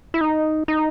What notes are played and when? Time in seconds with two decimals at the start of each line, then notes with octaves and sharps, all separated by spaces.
0.14 E4
0.21 D#4
0.68 D#4